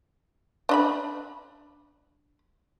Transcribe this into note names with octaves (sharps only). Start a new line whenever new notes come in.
D4 D#5 B5